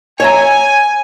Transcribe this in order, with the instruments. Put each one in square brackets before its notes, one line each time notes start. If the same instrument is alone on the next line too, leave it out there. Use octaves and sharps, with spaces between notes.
[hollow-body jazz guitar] C#5 E5 A#5 [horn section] G#5